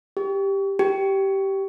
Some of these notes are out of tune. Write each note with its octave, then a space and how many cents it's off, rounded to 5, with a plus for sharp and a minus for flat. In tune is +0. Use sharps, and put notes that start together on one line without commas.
G4 +5
G4 -15